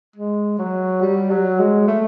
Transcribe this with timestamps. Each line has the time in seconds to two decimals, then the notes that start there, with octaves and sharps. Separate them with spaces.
0.16 G#3
0.58 F#3
1.01 G3
1.30 F#3
1.59 G#3
1.87 A3